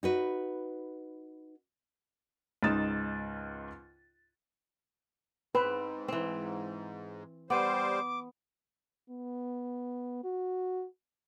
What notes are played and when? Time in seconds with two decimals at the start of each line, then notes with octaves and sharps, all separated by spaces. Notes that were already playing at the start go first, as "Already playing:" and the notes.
0.03 D#4 F#4 B4
2.63 C#2 G#2 D#4 D#6 A6 E7
5.55 G#2 C4 B4
6.08 E3 C4
7.50 G3 B3 C5 D6
9.10 B3
10.24 F#4